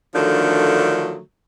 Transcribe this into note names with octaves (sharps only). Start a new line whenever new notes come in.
D3 D#3 F3 F#3 A3 D4